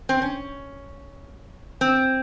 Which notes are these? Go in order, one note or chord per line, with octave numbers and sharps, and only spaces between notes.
C4
C#4
C4